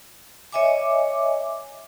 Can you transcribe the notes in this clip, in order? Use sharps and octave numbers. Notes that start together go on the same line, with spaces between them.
C#5 D#5 E5 G#5 D6